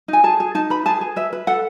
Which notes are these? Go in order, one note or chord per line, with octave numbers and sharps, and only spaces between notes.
D#4 G#5
G#4 A5
G#4
D#4 A5
B4 B5
G#4 A5
G#4
B4 E5
B4
A4 F#5